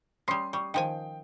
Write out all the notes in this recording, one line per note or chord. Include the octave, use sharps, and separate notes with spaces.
G3 C#4 C6 D#6 C7
G3 C#6
D#3 F3 G5 G#5